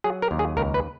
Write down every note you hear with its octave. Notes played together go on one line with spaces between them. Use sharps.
F#3 G#4
A#4
D#2
G#4
C#2 A#4
B4